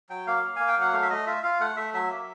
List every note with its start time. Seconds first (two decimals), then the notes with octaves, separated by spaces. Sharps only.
0.10 F#3 G5
0.27 A#3 F5
0.43 A#3
0.56 A#3 G#5
0.68 G5
0.76 F#3 F#5
0.93 A3 F5
1.02 E5
1.10 A3 D#5
1.27 F4 E5
1.43 F4 F5
1.60 A3 F#5
1.77 A3 E5
1.93 F#3 E5
2.11 A#3